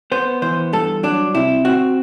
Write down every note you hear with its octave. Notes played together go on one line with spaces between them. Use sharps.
B3 C5
E3 C5
G2 A4
F#3 D4
C3 E4
C4 F#4